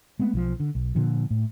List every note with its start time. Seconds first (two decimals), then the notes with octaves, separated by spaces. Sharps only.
0.19 G#3 A3 B3 C4
0.33 B1 D#3 F3
0.60 D3
0.75 B1
0.95 A#2 D3 F3
1.31 A2